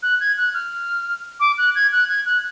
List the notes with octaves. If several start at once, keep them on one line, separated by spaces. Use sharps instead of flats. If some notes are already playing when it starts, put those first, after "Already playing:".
F#6
G#6
F#6
F6
D6
F#6
G#6
F#6
G#6
F#6